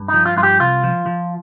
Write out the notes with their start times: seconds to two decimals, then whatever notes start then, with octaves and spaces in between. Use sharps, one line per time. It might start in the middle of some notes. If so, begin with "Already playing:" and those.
Already playing: G2
0.08 D#4
0.13 F3
0.26 F4
0.37 G2 F4
0.43 G4
0.60 C2 F4
0.84 F3
1.06 F3